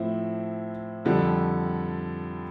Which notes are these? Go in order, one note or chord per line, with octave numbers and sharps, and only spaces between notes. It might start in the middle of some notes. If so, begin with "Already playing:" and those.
Already playing: A2 F3 C4 E4
F2 D3 G3